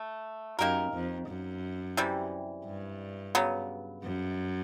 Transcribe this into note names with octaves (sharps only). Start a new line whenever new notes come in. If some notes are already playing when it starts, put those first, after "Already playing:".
Already playing: A3
F#2 A#3 D#4 G4 A#4
F2
F#2
C3 E3 G3
G2
C#3 F#3 B3
F#2